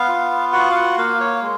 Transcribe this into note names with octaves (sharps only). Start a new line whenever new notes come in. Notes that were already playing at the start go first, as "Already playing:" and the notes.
Already playing: B3 F5
F4
F#4 F#5
F5
F#5
A#3 F5
C#5
G#3